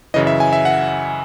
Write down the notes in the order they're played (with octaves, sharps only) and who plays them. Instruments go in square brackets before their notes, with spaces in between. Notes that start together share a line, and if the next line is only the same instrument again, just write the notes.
[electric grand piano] F#2 C#3 E3 D#5
E5
G#5
E5
F#5